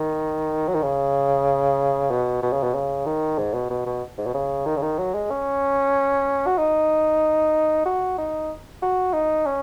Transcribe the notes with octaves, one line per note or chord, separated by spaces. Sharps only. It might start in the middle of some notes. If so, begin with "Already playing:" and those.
Already playing: D#3
F#3
D#3
C#3
B2
B2
C#3
B2
C#3
D#3
G#2
B2
B2
B2
G#2
B2
C#3
D#3
C#3
D#3
F#3
G#3
C#4
F#4
D#4
F#4
D#4
F#4
D#4
C#4